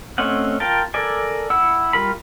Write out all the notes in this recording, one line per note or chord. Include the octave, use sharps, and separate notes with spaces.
A3 C4 C#4 D#5 F#5
F4 A#4 F5 G5 A5
A4 A#4 D5 G#5
E4 F#5 E6
G3 F4 A#4 B5